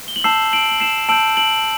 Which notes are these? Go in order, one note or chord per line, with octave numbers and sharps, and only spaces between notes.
G7
F#7
A5 E6 G6 C7 E7
D7 F#7
F#7
C7 E7
A5 E6 G6 D7 F#7
D7 F#7